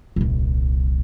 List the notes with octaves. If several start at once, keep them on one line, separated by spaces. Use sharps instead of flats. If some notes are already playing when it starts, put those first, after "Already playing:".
D#1 C2